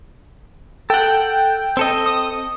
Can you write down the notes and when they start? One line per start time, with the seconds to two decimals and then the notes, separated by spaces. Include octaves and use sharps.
0.90 A4 F#5 G5
1.77 C4 A4 D#5
2.06 D#6